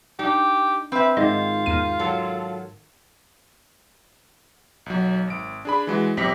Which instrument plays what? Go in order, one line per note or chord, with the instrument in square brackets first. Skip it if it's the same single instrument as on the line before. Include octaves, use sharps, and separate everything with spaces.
[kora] D4 [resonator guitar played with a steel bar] D#4 [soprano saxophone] G4
[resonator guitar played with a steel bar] C4 E5 [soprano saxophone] B4
[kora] G#2 D#3 [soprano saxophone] F4 [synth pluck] D#5
[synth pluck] E2 F6 D#7 [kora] D#3 A#4
[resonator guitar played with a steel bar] F#3 A4
[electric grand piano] B1 F#3
G#1 D7
D4 G#4 B5
E3 G#3 F#4
B1 F2 C4 G4 A#6 B6